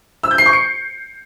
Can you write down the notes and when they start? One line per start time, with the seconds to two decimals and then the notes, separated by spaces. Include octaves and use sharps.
0.23 E6
0.31 G6
0.38 C7
0.46 C#6
0.53 C#7